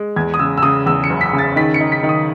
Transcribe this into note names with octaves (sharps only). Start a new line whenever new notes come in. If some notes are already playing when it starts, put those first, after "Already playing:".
Already playing: G#3
E2 G#6
D#6
C#3 E6
E6
C#3 D#6
E2 E6
C#7
F#1
B6
C#3
A6
D#3 B6
C#7
D#4
B6
D#3
D#6